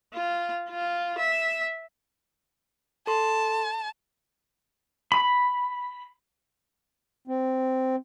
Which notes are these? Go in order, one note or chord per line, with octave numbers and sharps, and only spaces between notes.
F4
F4
E5
A4 A5 C6
B5
C4